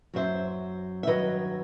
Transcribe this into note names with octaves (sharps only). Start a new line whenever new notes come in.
F#2 F#3 C5 E5
E5
G2 D#3 F#3 B4 D#5